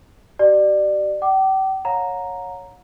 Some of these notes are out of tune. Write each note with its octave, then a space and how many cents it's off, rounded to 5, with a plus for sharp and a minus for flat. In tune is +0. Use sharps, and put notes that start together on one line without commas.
G4 -40 D5 +25
G5 -40 D6 +5
C#5 +0 F#5 -40 A#5 +0